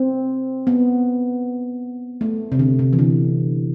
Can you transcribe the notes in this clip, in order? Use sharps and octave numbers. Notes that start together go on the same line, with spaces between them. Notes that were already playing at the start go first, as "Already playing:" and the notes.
Already playing: C4
B3
A3
C3
D3
C3
E3
D3